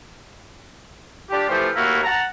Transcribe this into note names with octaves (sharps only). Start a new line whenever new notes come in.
D4 F4 G4
E3 F3 A3 G4 C5
D#2 A3 A#3 E4 F#4
F#5 A5 A#5